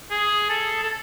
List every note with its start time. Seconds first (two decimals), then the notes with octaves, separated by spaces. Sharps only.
0.11 G#4
0.50 A4
0.83 A4